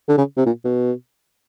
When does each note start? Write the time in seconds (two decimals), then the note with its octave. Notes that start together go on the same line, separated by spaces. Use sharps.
0.09 D3
0.18 C#3
0.37 C3
0.46 A#2
0.65 B2